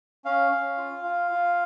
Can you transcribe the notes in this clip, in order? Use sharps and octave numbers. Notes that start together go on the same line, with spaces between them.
C#4 F5
C#4
F4
F4
F4